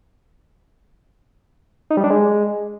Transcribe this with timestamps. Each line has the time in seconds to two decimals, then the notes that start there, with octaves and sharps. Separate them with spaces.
1.90 D#4
1.97 G3
2.04 D4
2.10 G#3